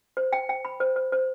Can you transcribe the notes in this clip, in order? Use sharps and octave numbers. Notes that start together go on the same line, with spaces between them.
C5
G5
G5
B5
C5
C5
C5